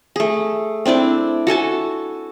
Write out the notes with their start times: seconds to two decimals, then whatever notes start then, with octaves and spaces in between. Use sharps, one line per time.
0.16 A3 G#4
0.86 C4 D4 E4 D5
1.47 F#4 A4 G#5 A5